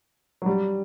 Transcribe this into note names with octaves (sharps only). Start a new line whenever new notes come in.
F#3
G3